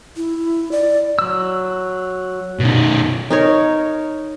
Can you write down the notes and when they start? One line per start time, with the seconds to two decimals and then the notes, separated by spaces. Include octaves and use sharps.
0.17 E4
0.72 D5
1.19 F#3 E6
2.60 B2 D#3
3.30 D#4 A#4 C#5